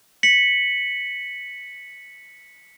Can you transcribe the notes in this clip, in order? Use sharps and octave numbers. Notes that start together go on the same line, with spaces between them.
B6 C#7 F#7